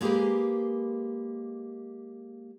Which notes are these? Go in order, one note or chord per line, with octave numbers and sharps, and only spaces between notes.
G#3 A#3 G4 G#4 A#4 B4